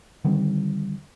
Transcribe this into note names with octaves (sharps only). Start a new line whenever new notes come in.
D3 D#3 G3 C4